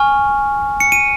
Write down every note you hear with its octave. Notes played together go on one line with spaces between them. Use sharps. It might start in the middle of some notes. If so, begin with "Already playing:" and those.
Already playing: G#5 C#6 F6
C#7
D#7